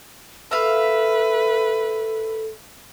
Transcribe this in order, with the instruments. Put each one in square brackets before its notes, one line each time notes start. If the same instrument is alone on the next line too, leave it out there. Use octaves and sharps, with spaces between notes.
[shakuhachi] A4 [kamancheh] B4 [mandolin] E5 F5